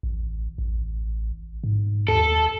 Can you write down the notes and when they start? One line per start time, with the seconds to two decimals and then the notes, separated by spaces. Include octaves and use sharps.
0.03 A1
0.58 A1
1.64 G#2
2.08 D#2 A4